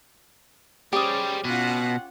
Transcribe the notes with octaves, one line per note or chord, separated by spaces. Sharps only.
G3 C#4 G4 G#4 C5 D#6
B2 C#4 F4 F#5